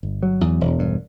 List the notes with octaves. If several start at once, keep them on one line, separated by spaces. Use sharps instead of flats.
G1
F#3
E2
E1
G2